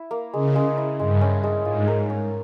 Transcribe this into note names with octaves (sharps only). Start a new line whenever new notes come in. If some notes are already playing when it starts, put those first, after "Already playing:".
Already playing: E4
A#3
C#3 G#3
G#3
E4
G2 G#3
C#4
G#3
G#2 F4
A#4
C#4